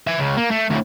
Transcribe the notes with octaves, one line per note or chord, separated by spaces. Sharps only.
E5 G#5
C#2 C#3
A#3
A3
D2 A2